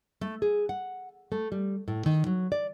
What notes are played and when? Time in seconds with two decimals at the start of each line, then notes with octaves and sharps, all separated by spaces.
0.21 A3
0.42 G#4
0.69 F#5
1.32 A3
1.52 G3
1.88 A2
2.06 D#3
2.27 F#3
2.52 D5